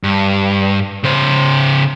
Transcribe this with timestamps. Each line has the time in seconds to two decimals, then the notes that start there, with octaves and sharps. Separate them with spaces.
0.03 G2
1.03 C#3 C5